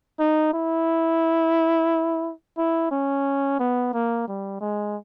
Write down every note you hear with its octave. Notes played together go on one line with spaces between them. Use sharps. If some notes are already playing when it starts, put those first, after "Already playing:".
D#4
E4
E4
C#4
B3
A#3
G3
G#3